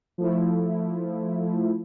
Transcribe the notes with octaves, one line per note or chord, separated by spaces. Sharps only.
F3 A3 E4